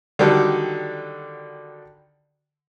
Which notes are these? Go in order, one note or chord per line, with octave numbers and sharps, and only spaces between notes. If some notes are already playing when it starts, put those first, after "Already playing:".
D3 D#3 F#3 G3 A4